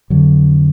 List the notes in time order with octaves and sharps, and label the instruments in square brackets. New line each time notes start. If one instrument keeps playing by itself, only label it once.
[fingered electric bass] F2 D3 F#3